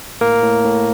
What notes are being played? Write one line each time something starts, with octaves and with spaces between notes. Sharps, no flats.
A2 A#3 A#4
A2
A2